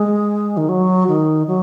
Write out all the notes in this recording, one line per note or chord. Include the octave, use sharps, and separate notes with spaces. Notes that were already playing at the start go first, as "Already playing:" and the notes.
Already playing: G#3
D#3
F#3
D#3
F#3